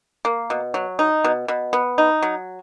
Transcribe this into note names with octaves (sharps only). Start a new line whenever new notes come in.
A#3
B2
F#3
D#4
B2
B2
B3
D#4
F#3